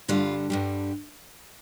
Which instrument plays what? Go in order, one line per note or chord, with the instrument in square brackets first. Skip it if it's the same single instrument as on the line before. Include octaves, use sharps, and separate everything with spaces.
[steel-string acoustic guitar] G2 D3 G3 F4
G2 D3 G3